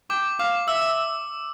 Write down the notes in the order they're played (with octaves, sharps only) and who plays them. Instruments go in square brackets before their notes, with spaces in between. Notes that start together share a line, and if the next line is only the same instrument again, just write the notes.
[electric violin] G5 [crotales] D6
[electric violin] F5 [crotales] D6
[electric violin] E5 [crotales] E6